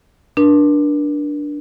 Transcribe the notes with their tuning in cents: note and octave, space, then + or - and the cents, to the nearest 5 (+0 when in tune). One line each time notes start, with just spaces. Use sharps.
D4 +0 A#4 +45